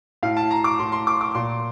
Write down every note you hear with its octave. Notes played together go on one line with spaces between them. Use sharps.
A2 F5
A5
A#5
D6
A2 C6
C6
D6
D6
A#2 C6